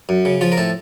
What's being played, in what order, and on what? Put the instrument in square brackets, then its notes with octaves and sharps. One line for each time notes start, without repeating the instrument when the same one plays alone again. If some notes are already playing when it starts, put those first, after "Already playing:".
[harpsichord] F#2
C#3
F3 F4
A#4
A2 A4